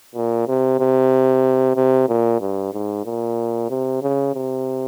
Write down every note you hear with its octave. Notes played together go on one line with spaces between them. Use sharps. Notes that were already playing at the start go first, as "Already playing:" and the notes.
A#2
C3
C3
C3
A#2
G2
G#2
A#2
C3
C#3
C3